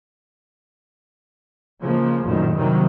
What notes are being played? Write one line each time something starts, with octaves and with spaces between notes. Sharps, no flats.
C#3 F3 G#3 A#3
A#1 F#2 A2 D#3 F3
C3 D#3 E3 F#3 G3 A#3